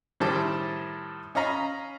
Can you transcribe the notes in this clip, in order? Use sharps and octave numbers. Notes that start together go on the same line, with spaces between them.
A2 D#3 G3 C5 A5 D6
C#4 D#5 F5 A#5 B5